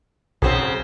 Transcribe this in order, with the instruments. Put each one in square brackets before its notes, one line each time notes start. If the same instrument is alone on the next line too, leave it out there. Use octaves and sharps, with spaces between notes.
[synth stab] B1 [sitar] F#2 C#3 C4